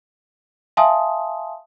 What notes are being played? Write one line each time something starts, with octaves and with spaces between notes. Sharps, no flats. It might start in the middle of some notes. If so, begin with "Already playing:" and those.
E5 F5 G#5 A5 C6 D#6